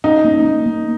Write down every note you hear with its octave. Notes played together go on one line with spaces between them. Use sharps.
C#4 D#4
A#3
A#3
A#3